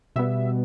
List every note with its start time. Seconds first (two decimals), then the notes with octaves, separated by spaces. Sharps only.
0.16 B2 G3 B3 E5